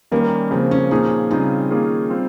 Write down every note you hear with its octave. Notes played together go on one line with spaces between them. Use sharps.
D#3 G3 A#3 C#4
C#3 F3 A#3 C4
C#4
A#2 F3 A#3 C#4 D#4 G#4
C#3 G3 C4 D#4 F4 G#4
D#3 A#3 C#4 F4 G#4
G3 C4 F4